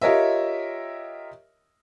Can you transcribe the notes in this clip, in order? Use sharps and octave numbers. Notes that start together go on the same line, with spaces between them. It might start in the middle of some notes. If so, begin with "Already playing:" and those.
F4 G4 A#4 C#5 D#5 E5